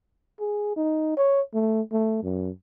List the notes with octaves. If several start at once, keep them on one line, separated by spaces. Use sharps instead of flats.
G#4
D#4
C#5
A3
A3
F#2